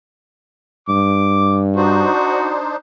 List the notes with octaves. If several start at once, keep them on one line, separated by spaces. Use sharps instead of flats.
G2 D6
D4 D#4 F#4 C5